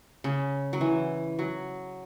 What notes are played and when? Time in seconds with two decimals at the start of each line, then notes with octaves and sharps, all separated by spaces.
0.24 C#3
0.73 F#3
0.81 E3
1.39 F#3